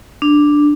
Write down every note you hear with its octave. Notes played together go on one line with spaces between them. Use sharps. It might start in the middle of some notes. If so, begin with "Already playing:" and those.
D4